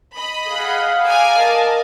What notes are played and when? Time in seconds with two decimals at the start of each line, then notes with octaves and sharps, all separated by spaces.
0.16 D#5 B5
0.51 G#4 F5 F#5
1.06 D5 G#5 A#5
1.38 A#4 D#5 A5